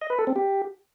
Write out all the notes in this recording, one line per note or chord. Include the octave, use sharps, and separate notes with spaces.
D#5
B4
A4
C4
G4